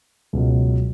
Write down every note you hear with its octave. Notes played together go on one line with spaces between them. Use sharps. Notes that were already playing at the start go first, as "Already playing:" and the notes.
C#2 B2 F#3